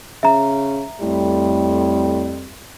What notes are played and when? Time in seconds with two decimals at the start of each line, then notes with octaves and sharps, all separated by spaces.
0.23 C#3 E5 A#5
1.02 F2 A2 G3